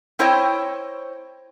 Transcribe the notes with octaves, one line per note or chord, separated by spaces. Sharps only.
C4 E4 C5 C#5 D#5 G5